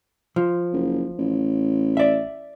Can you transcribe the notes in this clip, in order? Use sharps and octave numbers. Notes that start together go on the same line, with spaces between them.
F3
F#1
A1
D5 E5